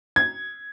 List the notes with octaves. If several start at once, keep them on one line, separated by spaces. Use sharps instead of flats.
G#6